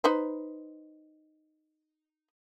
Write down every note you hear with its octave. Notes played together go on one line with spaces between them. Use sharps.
D#4 B4 C5